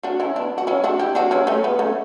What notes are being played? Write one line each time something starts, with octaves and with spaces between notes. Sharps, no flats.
D4 F#4
C#4 E4
B3 D4
F#4
C#4 E4
D4 F#4
E4 G4
D4 F#4
C#4 E4
A3 C#4
B3
A3 C#4